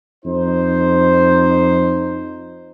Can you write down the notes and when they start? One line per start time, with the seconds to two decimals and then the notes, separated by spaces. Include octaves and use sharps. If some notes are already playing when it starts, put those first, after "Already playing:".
0.24 F2 D#4 C5